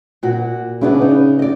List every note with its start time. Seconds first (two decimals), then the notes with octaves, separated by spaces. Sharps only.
0.23 A#2 F#4
0.81 C#3 B3 D4 E4
1.02 D#4
1.39 D5 D#5